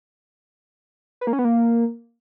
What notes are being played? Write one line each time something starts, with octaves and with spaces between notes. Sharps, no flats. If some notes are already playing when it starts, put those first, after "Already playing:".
B4
A#3
C#4
B3
A#3